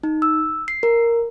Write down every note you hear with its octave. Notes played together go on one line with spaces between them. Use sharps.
D#4
E6
C7
A#4